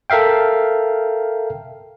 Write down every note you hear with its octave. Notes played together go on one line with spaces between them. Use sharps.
A4 A#4 E5 F5 G5